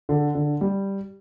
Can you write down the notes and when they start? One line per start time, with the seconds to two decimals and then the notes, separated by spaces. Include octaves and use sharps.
0.09 D3
0.35 D3
0.61 G3